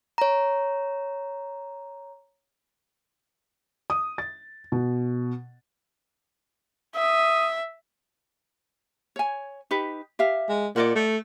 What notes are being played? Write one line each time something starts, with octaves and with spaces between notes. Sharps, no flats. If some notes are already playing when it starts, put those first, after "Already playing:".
C#5 A#5
D#6
A6
B2
E5 D#6
C#5 G#5
D#4 G4 B4
G4 E5 F5
G#3
A#2 D5 D#5 F#5
A3